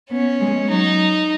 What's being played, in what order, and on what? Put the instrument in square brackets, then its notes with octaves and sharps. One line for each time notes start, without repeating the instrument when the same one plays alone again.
[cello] B3 [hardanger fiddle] C#4
[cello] G#3
[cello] F#3 [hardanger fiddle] D#4